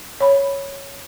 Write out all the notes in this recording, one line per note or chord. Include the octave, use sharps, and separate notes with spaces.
C#5 B5